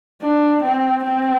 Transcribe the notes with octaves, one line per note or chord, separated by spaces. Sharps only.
D4
C4
C4